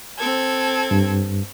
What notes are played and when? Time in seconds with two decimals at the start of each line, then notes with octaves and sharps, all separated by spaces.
0.18 C4 A4 G#6
0.91 G2